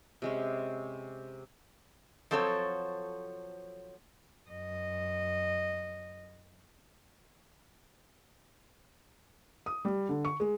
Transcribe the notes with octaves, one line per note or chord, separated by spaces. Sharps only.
C3 G#3 C#4
F3 F#3 C4 A4 C#5
F#2 D#5
D#6
G3
D3
C#6
G#3